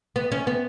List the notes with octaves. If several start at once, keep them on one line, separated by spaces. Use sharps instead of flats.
B3
C#4
B3